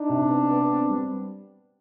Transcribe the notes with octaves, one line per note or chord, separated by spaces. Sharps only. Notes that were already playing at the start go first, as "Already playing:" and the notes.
Already playing: D4 D#4
C3
B3
B3
C4
G3